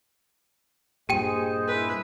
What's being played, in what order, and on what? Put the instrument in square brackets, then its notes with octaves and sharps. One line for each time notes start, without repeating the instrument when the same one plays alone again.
[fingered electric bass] G2 A#2 [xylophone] G4 G5 D#7 [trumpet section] G#4 C5 D#5
[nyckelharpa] E4 B4